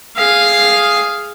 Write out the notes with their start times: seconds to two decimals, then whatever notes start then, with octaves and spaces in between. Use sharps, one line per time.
0.17 G#4 F5